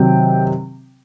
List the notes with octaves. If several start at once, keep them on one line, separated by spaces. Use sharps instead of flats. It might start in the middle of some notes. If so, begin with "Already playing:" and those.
Already playing: C3 D#3 F#3 G5